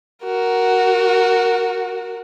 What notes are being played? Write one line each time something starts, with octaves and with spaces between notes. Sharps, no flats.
F#4 A#4